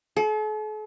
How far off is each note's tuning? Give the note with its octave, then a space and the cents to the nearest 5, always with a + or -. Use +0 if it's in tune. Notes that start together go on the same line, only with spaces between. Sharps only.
A4 -45